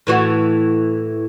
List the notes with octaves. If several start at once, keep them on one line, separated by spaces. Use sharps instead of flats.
A2 E3 F#4